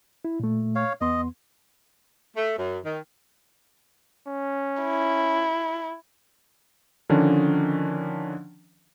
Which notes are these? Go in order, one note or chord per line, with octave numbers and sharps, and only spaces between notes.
E4
A#2 A3
C#5 F5
E2 B3 D#5 C6
A3
F#2
D#3
C#4
E4
D3 D#3 F3 C#4 D4